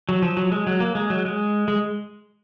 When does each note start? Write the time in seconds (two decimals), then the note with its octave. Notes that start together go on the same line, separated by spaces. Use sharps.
0.09 F#3
0.22 F3
0.37 F#3
0.52 G#3
0.67 F#3
0.80 A#3
0.95 G#3
1.10 F#3
1.25 G#3
1.68 G#3